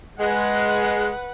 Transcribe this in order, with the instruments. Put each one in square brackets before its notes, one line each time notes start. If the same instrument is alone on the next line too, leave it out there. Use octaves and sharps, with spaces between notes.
[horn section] G#3 [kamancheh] B4 F#5